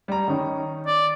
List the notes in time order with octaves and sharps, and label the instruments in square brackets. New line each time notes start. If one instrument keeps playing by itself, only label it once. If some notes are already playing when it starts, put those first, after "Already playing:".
[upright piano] G3 A#5
D#3 C#4 D#4
[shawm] D5